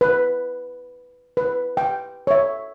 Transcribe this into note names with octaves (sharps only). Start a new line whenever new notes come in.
B4
B4
G5
C#5 E5